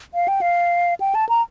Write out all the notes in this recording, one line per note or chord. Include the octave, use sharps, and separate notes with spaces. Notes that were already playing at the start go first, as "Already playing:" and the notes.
F5
G5
F5
G5
A5
A#5